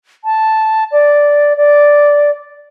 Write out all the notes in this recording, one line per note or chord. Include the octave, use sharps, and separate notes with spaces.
A5
D5
D5